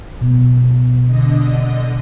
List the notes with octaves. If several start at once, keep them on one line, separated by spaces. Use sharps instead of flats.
B2
D3 D#5